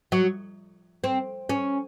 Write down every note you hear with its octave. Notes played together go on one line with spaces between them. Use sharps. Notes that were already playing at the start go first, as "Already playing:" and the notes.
F#3
C4
C#4